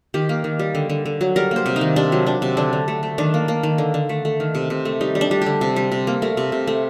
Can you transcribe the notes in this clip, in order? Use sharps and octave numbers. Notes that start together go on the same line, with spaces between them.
D#3 G4
A#3
D#3
G3
D3
D3
D3
F#3
G3 A#4
A#3 C5
C3
D#4
D#3
C3 D4
F#3
F#3 D4
C3
D3 D4
D3
A3
A3
D#3 D4
A#3
A#3
D#3
D3
D3
A3
A3
D#3
C3
C3
A3
G3 D#4
G3
D4
G3
D3 G4
C3
G3
C3
A#3
A3 A#4
C3
C3
A3